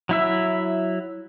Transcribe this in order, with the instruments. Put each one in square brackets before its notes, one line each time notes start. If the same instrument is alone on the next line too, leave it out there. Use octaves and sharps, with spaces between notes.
[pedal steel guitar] F#3 E4 E5